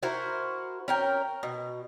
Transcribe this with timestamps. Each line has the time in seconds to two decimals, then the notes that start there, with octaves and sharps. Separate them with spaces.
0.03 E4 F#4 A#4 C5
0.88 C#4 A#4 G5
1.43 B2